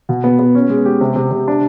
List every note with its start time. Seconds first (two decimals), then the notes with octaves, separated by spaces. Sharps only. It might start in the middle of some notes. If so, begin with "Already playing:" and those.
0.09 B2
0.24 B3
0.39 B3
0.55 C#4
0.70 G#3
0.85 G4
1.01 C3
1.16 C3
1.31 C3
1.48 D4